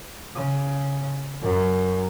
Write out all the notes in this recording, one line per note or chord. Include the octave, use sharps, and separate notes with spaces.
C#3
F#2